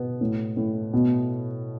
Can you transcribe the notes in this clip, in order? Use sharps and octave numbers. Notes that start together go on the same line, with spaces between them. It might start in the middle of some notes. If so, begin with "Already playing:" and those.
Already playing: B2 B3
A2
A2
B2